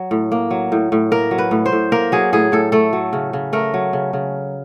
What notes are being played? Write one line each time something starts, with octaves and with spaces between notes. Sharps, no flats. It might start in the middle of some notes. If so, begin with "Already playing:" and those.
Already playing: F#3
A2
A#3
F#3
A2
A2
A#3 A#4
F#3
B4
A2
C5
A2
A#3 A#4
F#3 G#4
A2 G#4
A2 A4
A3 A4
F#3
C#3
C#3
A3 A#4
F#3
C#3
C#3